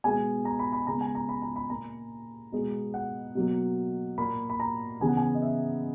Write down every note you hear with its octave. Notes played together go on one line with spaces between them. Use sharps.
B2 G#3 B3 G#5
A#5
B5
B5
C#3 G#3 B3 A#5
G#5
A#5
B5
A#5
B5
A#2 A#3 A#5
B2 G#3 B3
F#5
B2 F#3 A#3
A#2 A#3 B5
B5
A#5
C#3 E3 B3 G#5
F#5
G#5
D#5
E5